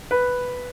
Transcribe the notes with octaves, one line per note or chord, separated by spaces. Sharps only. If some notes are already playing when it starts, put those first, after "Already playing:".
B4